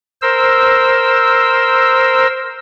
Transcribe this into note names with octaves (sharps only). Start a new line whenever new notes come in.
A#4 C5 E6